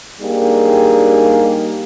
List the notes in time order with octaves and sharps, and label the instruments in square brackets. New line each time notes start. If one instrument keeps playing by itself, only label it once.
[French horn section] G3 A#3 D4 D#4 G4 G#4